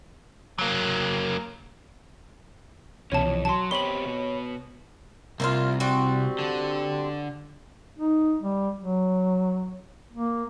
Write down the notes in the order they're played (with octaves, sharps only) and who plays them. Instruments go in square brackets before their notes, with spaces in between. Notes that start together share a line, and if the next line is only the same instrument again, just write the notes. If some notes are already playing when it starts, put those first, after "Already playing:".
[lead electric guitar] F#3 A#3
[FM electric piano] C2 B2 E3 [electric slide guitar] C#4 E4 [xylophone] C#5 A5
[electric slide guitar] F2
[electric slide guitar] F#3 [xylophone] A5 C6
[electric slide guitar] B3 C4 G4 [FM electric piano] C#5 B5 [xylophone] F#7 G7
[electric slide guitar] B2 B3
[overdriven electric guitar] C2 [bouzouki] A#3 E4 F4
[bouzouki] G3 C4 F#4
[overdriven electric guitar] D3
[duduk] D#4
G3
F#3
A#3